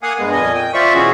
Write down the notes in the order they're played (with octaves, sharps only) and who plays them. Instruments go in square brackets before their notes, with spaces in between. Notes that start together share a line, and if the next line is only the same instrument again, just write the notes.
[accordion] A#3 F5 F#5 G#5 D#6
G2 G#3 B3
F2 A#2 D#5 G#5
G5
F4 C5 D5 E5 C#6
B2 E3 C#4 F#4 G#4